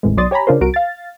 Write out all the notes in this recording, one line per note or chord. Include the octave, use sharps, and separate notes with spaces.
G#1 E2 A2 C3 G#3
B1 F#3 D5 C6 D#6 A6
G4 C#5 G#5 A#5 B5
C#3 D4 F4 A#4 C5
C2 F#4 A#4 D7
F5 A6